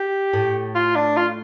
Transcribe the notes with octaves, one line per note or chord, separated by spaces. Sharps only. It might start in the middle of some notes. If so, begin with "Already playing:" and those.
Already playing: G4
A2
F4
D4
F4